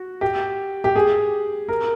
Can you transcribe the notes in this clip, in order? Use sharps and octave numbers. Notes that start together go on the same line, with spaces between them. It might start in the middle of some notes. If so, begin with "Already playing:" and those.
Already playing: F#4
G4
G4
G#4
A#4